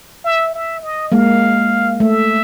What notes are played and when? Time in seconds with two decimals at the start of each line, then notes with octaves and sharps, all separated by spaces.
0.24 E5
0.54 E5
0.83 D#5
1.12 G#3 A#3 F5
2.00 A3 E5